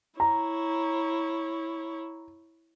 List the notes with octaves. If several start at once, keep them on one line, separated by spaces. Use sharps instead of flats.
E4 C#5 A#5